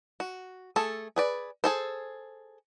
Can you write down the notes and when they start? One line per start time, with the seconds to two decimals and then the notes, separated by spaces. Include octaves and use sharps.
0.20 F#4
0.76 A3 G#4 A4
1.16 G#4 B4 D5
1.64 G#4 A4 C5